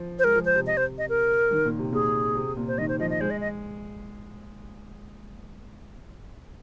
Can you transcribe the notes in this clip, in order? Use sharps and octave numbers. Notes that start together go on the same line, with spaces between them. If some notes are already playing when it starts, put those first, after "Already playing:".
Already playing: F3
C5
G#3 A#4
F3
C5
C3
D#5
C5
D#5
A#4
D#3
A#2
C3
A#2 G#4
C3
A#2
C5
D#3 D#5
C5
F3 D#5
D#5
G#3 C5
D#5
D#5